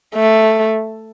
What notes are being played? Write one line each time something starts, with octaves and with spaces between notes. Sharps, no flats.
A3